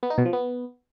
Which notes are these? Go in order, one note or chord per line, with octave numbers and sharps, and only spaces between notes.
B3
D#4
B2
F3
B3